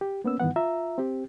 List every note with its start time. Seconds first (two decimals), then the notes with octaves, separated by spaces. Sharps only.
0.01 G4
0.24 A#3 B3 C#4 E6
0.40 G2 D#3 E3 B3 F#5
0.56 F4 E5 A#5 E6
0.98 C4 G4